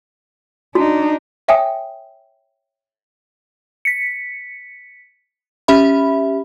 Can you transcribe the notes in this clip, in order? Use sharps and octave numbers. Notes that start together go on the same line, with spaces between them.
D4 D#4 F#4
C#5 E5 G5 G#5 D#6
B6 C#7
C#4 G4 E5 B5